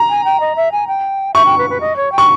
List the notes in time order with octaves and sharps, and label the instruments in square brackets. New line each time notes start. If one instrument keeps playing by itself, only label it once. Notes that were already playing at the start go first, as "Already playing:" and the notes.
Already playing: [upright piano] A#5
[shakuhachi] G#5
G5
D#5
E5
G#5
G5
[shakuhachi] E5 [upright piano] C#6
[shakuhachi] G5
B4
B4
D#5
C#5
G5
[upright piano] C#6